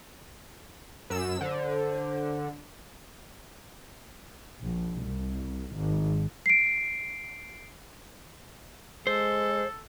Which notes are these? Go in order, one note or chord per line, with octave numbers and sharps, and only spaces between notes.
F#2 E6 E7
D3 C5
A#1
C2
G#1
C7 D7
G#3 A4 C5